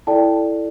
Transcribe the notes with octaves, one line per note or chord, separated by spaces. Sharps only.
E4 A4 D5 G5 A5